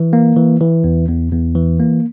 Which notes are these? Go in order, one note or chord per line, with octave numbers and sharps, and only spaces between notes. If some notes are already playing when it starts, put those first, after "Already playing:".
Already playing: E3
A#3
E3
E3
E2
E2
E2
E3
A#3